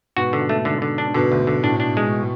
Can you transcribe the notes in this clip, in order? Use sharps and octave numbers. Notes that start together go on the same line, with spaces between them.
G#2 B2 F#4
D3
A3
G#2 D3
D3
D4
G#2 B2 D3
D2
D3
A2 D4
D4
G#3